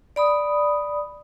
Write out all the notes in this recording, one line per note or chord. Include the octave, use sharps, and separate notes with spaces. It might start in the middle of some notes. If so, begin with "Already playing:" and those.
D5 B5 D#6